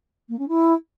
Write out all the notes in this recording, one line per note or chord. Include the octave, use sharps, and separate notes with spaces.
A#3
C#4
E4